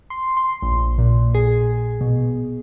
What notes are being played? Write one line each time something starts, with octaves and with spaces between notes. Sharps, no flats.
C6
C6
A#1
A#2
G#4
B2